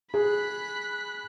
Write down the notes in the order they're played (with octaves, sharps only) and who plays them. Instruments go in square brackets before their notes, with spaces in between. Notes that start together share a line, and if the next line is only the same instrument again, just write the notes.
[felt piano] G#4 [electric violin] B5 F#6